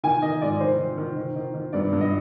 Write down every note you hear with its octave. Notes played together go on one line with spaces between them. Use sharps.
D#3 G#5
D#3 D#5
G#2 D5
D#3 C5
D#3
D#3
D#3
D#3
D#3
G2 D5
G2
D#5